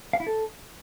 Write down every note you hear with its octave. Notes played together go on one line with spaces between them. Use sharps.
F5
E4
A4